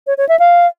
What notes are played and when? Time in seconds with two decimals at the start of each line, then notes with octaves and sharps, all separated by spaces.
0.07 C#5
0.18 C#5
0.29 E5
0.39 F5